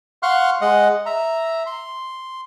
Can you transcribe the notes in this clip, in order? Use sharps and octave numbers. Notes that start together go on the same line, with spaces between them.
F5 F#5 C6 C#6 F6 F#6
G#3 D#5 F#5
E5 A#5
C6